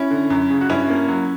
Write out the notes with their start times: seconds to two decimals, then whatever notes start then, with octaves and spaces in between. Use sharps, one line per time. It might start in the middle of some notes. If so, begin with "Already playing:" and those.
Already playing: C#4 E4
0.11 D3
0.30 F#2
0.50 C#3
0.61 F#4
0.70 G2 C#4 E4
0.90 A#3
1.08 F#3